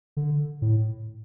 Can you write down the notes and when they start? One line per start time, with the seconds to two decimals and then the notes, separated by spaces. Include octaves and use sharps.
0.17 D3
0.62 A2